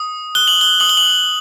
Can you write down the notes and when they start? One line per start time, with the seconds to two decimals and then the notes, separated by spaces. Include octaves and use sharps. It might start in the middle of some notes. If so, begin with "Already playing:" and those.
Already playing: D#6
0.35 F#6 G7
0.47 F#7
0.61 G7
0.80 D#6 F#7
0.89 G7
0.97 F#7